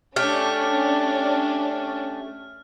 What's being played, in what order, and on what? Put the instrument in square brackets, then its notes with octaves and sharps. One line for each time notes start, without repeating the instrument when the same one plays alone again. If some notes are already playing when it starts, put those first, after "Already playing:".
[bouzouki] A3 G4 [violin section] C#4 D4 [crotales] F6